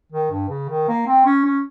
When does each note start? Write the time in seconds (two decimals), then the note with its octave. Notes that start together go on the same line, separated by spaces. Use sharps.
0.12 D#3
0.31 G2
0.49 C#3
0.69 D#3
0.88 A#3
1.07 C4
1.25 C#4
1.44 C#4